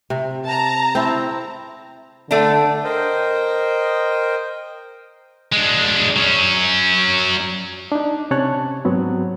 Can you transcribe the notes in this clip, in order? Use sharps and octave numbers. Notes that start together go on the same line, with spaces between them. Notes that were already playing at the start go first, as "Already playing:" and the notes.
C3
A5 A#5
C4 E4
D3 A3 D4
A#4 C5 D#5 G5
G#3 D4
F#3 C#4
D4 D#4
C3 C#4 C#5 A5 F#6
G#2 F#3 B3 C4